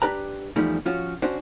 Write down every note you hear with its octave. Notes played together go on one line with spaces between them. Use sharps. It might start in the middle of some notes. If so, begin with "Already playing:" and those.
D4 G4 B4 A#5
E2 E3 F3 G3 A3 D#4
F3 C#4 F4 F#4 C#5
C#4 D4 F#4 C5